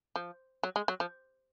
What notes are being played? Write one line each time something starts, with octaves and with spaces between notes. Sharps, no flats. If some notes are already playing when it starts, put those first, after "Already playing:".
F3
F#3
G#3
F#3
F3